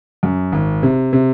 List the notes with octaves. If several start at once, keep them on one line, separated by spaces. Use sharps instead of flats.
F#2
G#1
C3
C3